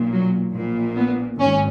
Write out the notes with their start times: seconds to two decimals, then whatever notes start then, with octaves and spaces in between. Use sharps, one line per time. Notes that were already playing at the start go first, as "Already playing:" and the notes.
Already playing: B1 A#2
0.11 F#3
0.53 A#1 A#2
0.97 B3
1.40 G#1 C#4